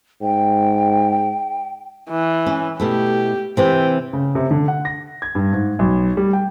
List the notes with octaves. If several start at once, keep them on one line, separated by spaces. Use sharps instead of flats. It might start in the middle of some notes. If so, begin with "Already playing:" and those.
G#2 G5
E3
C#4
B2 A3 E4 G4
C3 E3 C4 G5
C#3
C3
D3
F#5
A#6
G#6
G2
G#2
B1
G3
G5